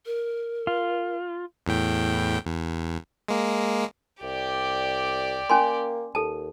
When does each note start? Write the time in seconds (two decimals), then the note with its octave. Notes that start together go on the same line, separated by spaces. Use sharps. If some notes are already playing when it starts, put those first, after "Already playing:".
0.06 A#4
0.67 F4
1.66 E2 A2 G5
2.45 E2
3.28 G#3 A#3
4.22 C2 G4 D5
5.50 A#3 C#4 G#5 C6
6.15 D#2 A4 A5